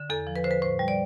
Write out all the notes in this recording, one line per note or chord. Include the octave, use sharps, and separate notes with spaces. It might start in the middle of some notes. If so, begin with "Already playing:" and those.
Already playing: D3
E2 A4
F3
B4
D3 C5
B4
A2 C5
G3
D5